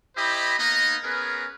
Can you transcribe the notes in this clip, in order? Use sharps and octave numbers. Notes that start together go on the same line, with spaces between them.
E4 G4 C5 D#5 B5
A#3 B3 D#4 D#5 A#5
B3 C#4 G#4 A#4 B4